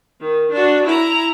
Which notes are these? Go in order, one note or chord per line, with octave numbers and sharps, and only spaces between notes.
D#3
D4 F#4
E4 A#5